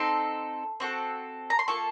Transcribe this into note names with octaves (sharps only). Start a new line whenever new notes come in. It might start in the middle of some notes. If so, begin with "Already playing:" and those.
Already playing: C4 D#4 A4 C6
C4 F#4 A4
A#5
C6
A#3 F4 A4 C#6